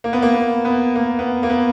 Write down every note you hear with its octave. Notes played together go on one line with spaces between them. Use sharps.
A#3
B3
A#3
B3
B3
A#3
B3
A#3
B3